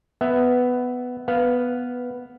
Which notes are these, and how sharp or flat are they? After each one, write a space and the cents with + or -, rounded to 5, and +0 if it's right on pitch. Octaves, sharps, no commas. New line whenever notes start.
B3 +10 E5 +0
B3 +0 F5 +0